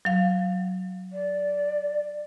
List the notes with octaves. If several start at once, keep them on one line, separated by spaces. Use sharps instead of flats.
F#3 F5
D5